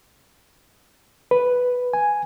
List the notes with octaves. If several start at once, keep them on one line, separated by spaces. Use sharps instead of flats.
B4
G#5